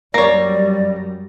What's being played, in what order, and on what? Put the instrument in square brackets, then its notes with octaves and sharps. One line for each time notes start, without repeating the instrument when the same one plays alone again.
[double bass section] F#2 F#3 G3 [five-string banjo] A#3 C#5 [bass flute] D5 [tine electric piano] A#6